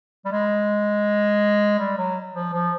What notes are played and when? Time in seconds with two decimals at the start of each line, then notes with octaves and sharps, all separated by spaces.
0.25 G3
0.32 G#3
1.79 G3
1.98 F#3
2.35 F3
2.53 F3